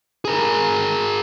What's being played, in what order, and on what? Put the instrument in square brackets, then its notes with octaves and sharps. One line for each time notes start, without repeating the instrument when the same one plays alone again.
[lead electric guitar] G#4 A#4